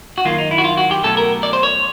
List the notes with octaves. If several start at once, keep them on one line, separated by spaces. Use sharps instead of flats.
F#4
F#2 D#3 F#3 A#3 F4
D#4
E4
F#4
F4
F#4
G4
B2 F#3 A3 C#4 A4
A#4
D5
C5
C#5